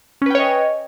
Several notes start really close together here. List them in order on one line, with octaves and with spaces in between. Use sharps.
C#4 B4 G5 C#5 D#5